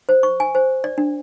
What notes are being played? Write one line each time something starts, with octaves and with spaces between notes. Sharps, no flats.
C5
C#6
G#5
C5
D5
D4